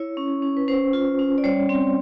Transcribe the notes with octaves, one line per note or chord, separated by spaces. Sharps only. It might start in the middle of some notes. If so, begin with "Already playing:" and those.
Already playing: E4 C#5
C#4
C#4
B4
C#4 C5
F4
C#4
D5
G3 C#5
C4